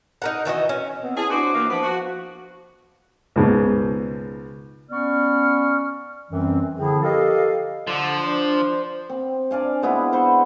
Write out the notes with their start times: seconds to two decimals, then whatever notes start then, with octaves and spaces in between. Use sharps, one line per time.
0.22 D#4 A#4 F#5
0.45 D#3 E3 F#4 D#5
0.69 C#4
1.03 B3 C4
1.16 C#4 E4 G#4 A5
1.30 D4 F#4 C5 D6
1.53 E3 A#3
1.70 F3 B3
1.83 F#4
3.36 C#2 G#2 B2
4.91 B3 C#4 D5 C#6 F6
6.31 F#2 E3 G3 C4
6.78 D3 F3 C4 E4 G#4
7.03 G4 A4 A#4 D#5 F5
7.87 D3 F3
8.25 D4 C5
9.09 C4
9.51 D4 D5 F5 G#5
9.82 G#3 B3 E4 F4
10.12 B4 C5 F#5 C#6